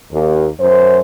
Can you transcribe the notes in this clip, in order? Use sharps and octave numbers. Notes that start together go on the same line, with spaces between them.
D#2
F#2 C5